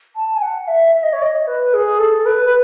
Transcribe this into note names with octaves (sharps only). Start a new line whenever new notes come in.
A5
G#5
F#5
E5
E5
D#5
C#5
D#5
B4
G#4
A4
B4
B4